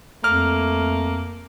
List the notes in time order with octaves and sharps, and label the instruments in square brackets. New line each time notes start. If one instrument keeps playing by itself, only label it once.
[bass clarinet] F2 [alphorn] A3 [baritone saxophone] A#3 [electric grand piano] F6